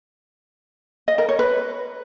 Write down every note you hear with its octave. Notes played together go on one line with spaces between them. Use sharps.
D#5
A#4
C#5
B4